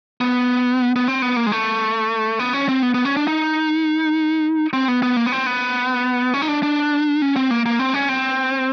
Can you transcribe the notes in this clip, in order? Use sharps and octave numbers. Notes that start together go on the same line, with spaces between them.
B3
B3
C4
B3
A#3
G#3
A3
B3
C#4
C4
B3
B3
C#4
D4
D#4
C4
B3
B3
A#3
B3
C4
B3
C#4
D#4
D4
D4
C#4
C4
A#3
A#3
C4
C#4
C4